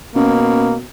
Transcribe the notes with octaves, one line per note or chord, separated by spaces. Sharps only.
B2 A#3 C#4